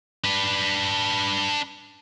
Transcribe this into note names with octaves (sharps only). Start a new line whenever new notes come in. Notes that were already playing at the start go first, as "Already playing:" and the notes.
D4 B4